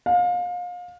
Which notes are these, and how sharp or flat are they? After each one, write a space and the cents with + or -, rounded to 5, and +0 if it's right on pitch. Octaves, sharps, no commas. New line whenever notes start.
F5 +30